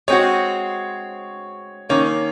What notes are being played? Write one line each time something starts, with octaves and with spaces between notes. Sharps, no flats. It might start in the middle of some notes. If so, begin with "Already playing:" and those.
G#3 C4 F#4 C#5
D#3 A#3 C#4 C#5